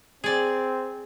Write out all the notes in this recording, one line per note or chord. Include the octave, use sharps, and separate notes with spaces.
C4 G#4 D5